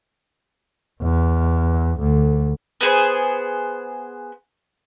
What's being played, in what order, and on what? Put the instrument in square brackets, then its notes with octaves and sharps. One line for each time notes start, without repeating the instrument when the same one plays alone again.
[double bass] E2
D2
[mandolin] B3 G#4 C5